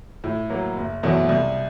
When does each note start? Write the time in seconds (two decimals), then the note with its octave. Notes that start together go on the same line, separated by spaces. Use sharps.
0.24 A2
0.50 F#3 A#3
0.77 F#1
1.03 E2 B2 F#3 A3
1.29 C2